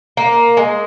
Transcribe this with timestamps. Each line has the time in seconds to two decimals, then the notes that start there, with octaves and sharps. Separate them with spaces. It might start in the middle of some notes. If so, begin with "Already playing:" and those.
0.17 A#3
0.57 G#3